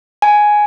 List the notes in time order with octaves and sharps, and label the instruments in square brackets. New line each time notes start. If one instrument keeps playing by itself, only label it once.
[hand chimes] G#5